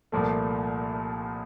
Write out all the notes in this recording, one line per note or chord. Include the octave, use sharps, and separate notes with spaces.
C2 A#2 F3 A3